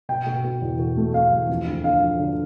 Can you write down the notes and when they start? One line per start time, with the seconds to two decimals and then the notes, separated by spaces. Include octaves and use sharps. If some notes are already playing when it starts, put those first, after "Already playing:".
0.09 B2 G5
0.27 B2
0.44 B2
0.62 E2
0.79 B2
0.97 A3
1.14 A3 F5
1.32 E2
1.49 F3
1.67 D2
1.84 D2 F5
2.01 F3
2.19 D3